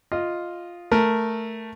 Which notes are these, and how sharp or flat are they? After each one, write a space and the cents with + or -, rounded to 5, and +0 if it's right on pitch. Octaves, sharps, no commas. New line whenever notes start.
F4 +0 D#5 +0
A3 +0 A#4 +0